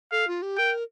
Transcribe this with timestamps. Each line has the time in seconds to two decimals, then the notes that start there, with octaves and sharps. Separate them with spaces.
0.12 A4 F5
0.27 F4
0.42 G4
0.58 A#4 G5